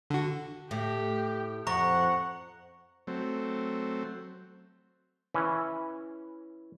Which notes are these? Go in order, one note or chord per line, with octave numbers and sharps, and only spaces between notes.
D3 F#4
A2 G4
F2 F#5 A#5 C#6 A#6
F#3 A3 C4
E3 C#4